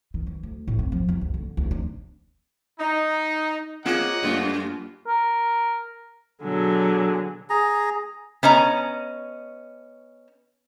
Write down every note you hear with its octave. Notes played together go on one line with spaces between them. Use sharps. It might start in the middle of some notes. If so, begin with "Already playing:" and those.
D#3
E3
D2
A2
C4
F3
E2
D2
D3
D2
D4
D#4
A#3 C4 F4 G#4 C#5 D#5 F#5
F#2 G3 A3 A#3 F4
A#4
B2 D3 F#3 G#4
G#4 A#5
B3 C#4 D#5 A#5